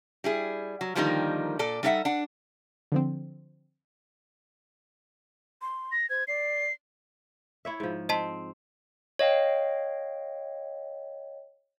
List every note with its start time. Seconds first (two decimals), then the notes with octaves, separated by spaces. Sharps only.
0.24 G3 E4 G#4
0.81 F#3
0.95 D3 D#3 F3 G3 A#3 D#4
1.59 A#2 A4 D5
1.83 G3 D#4 A4 C#5 E5 F#5
2.05 D4 F#5
2.92 D3 F3 C4
5.62 C6
5.92 A#6
6.10 C5 G#6
6.28 D5 C7
7.65 E4 C#5 E5
7.80 G#2 F3
8.09 C4 D#5 A5 B6
9.19 C#5 D#5 F5 G5